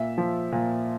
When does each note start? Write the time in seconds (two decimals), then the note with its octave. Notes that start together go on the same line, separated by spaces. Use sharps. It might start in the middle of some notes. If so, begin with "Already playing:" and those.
Already playing: A#2 E5
0.18 F3
0.52 A#2